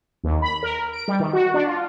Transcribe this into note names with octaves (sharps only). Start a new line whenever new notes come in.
D#2
B5
A#4
D7
G3
D#3
F#4
D4
F4